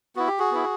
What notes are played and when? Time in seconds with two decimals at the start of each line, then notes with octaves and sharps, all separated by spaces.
0.16 B3 E4 F#4
0.27 G4
0.39 F#4 G#4
0.51 B3 E4